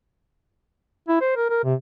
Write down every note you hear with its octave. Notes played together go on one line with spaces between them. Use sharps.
E4
C5
A#4
A#4
C3